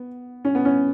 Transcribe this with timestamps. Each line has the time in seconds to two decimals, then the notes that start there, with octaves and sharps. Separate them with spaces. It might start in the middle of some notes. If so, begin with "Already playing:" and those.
Already playing: B3
0.45 C#4
0.55 B3
0.65 C#4